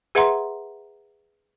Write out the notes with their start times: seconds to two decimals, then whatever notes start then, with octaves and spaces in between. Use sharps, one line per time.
0.15 G#4 B4 E5 F#5 A#5 C6